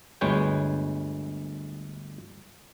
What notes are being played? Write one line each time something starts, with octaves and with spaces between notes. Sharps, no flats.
G1 D2 G#3 B4 C#5 G5